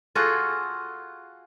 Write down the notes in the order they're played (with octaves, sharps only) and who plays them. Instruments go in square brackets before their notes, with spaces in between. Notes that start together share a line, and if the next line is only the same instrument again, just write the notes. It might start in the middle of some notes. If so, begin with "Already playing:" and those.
[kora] F4 F#4 G#4 A4